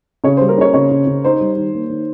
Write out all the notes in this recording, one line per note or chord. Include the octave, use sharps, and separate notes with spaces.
C#3 C#5
C5
G3
A#4
C#4 C#5
C#3 C#5
C#3
C#3
D#4 C5
G3
D#3
A#3
D#3